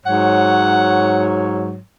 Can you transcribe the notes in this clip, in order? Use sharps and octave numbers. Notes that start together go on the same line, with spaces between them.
G#2 F#3 C#5 F#5